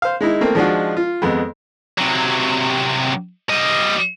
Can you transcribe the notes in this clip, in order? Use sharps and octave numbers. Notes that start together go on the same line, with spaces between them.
C5 F5
G#3 D#4 E4
A3 A#3 C4
F3 G#3 D4 D#4 F4 F#4
F4
F2 G#3 B3
C3 F#3
G3 D#5